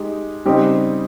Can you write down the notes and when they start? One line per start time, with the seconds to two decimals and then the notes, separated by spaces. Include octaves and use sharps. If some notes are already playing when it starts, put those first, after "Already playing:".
Already playing: G#3 D#4 G4
0.45 C#3 G3 C4 D#4 G4